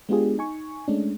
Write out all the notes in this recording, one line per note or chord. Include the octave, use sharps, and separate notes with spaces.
G#3 B3 D4 F4 G4 G#4
D#4 G#5 C#6
G#3 A3 C#4 D4